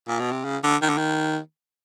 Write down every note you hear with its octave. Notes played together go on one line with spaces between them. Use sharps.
A#2
B2
C3
C#3
D3
D#3
D3
D#3